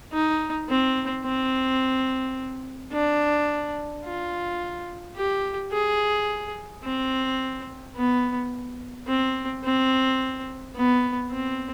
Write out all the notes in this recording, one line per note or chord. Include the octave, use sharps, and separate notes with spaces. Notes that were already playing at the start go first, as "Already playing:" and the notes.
D#4
C4
C4
D4
F4
G4
G#4
C4
B3
C4
C4
B3
C4